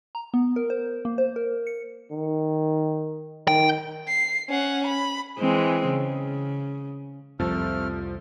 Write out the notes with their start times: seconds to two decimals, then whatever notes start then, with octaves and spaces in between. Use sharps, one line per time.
0.15 A#5
0.34 B3
0.56 A#4
0.70 C5
1.05 A#3
1.18 C5
1.36 A#4
1.67 C#7
2.11 D#3
3.48 D#3 G5
4.08 C7
4.49 C#4 F#5
4.87 B5
5.39 E3 G#3 C4
5.91 C#3
7.40 C2 F2 F3 A3 C4 A4 F6